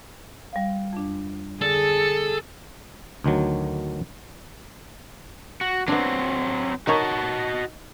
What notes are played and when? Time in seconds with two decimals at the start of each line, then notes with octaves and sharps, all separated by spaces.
0.53 G3 F5
0.93 F2 D4
1.62 D3 G#4 A4
3.24 D2 D#3 F#3
5.61 F#4
5.88 F#3 B3 C4 D4
6.87 D#4 F#4 A#4 C#5 D#5 A5